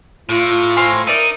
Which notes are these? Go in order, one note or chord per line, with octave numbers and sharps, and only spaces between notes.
A2 F4
C4 F5 G#5
D#4 A#4 D5 E5